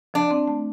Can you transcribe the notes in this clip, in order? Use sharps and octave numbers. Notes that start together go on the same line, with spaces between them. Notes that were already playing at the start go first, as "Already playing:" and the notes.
F3 D4
C4
A3